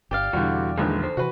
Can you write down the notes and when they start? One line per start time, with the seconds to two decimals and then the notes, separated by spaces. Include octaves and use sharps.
0.11 G1 G4 D5 F5
0.33 E2 B2 D3 E3 G3 F#4
0.78 A#1 D3 D#3 G#3 E4 B4
1.03 A4 C5
1.17 C3 E3 F#4 B4